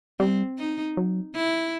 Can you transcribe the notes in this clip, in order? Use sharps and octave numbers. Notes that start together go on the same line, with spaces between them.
G3 C4
D#4
F#3
E4